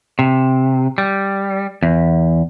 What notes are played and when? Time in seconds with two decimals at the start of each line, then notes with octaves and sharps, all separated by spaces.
0.19 C3
0.98 G3
1.83 E2